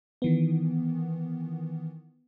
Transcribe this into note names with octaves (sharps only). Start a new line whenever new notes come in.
D#3 E3 B3